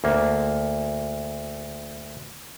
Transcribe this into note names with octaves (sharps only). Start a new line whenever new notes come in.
D2 A#3